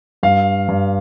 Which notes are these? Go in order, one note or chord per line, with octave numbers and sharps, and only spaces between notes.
G2 F5
G2